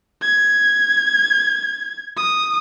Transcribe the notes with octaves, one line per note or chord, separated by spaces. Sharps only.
G#6
D#6